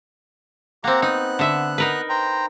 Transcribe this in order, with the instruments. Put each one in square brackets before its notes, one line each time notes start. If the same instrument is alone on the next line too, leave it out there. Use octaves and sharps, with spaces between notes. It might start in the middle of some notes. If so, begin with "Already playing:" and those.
[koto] A#3 C4 [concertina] G4 F#5 A#5
[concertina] B3 F#6 [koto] D#4
[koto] D3 E5
D#4 A#4 B4
[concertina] C5 G5 A#5